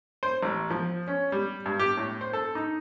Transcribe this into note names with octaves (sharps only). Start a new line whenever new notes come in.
C5
A1
F3
C#4
G3
G2
G4
A2
C5
A4
D#4